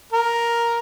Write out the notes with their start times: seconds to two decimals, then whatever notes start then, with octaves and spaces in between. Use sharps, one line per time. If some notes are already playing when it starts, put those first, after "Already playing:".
0.12 A#4